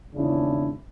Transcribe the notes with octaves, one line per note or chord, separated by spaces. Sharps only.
G#1 E2 C#3 D4 E4